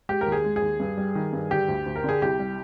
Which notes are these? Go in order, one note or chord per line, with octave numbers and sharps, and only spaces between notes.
G#3 G4
A#4
D#2
G#4
G#3
G#4
D#2
G2
G3
D#3
G2
D3 G4
D2
D2
A#4
D3 G#4
C2 G4
G3